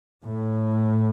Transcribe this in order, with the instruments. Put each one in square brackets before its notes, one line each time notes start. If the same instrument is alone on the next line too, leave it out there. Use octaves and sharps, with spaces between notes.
[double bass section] A2